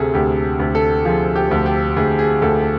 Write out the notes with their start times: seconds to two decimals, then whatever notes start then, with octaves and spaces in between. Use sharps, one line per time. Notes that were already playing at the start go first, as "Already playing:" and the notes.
Already playing: D2 C3 G#4 A4
0.14 D2 G4
0.60 D2
0.75 A4
1.05 F3 G#4
1.36 G4
1.51 D2
1.66 G4
1.97 D2 G#4
2.19 G#4
2.42 D2 A4